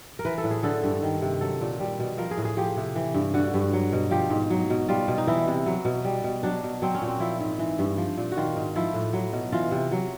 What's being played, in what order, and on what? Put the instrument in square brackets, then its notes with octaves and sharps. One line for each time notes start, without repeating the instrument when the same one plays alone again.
[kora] A#4
E3 B4
A4
A2
G#4
D3 A4
G2
D#3
C3
F#3 A4
A#2
G3
B2
F3 A#4
G#4
A2
G#4
F3 G4
C3
E3
G2
D3 F#4
G2
F#3
B2
F3 G4
G#2
F#3
B2
G3 F4
B2
D#4
E3 E4
C3
F#3
B2
G3
B2
F#3 D4
B2
F#3 C4
C#4
A#2
C4
F3 E4
G#2
E3
G2
F3
A#2
F#4
D#3 F4
G#2
F3 E4
A2
F#3
B2
E3 F4
C3
F#3